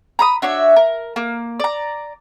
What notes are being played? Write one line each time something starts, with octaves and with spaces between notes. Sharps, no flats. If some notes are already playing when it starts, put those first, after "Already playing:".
A#5 B5 D#6
D4 F#4 C#5 E5
A#4
A#3
D5 A#5